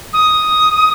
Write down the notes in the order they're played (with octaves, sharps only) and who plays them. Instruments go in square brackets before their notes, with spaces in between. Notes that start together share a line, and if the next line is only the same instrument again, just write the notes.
[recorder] D#6